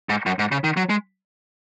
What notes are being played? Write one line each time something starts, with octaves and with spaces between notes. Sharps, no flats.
G#2
F#2
G#2
C#3
D#3
F#3
G#3